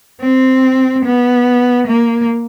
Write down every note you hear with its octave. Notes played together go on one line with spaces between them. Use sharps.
C4
B3
A#3